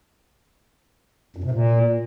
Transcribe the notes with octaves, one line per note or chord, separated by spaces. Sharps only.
F#2
C3
A#2